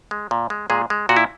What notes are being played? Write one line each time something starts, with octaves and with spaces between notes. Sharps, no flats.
G#3
A#2
G#3
A#2 G#3 G#4
G#3
A#2 F#4
E4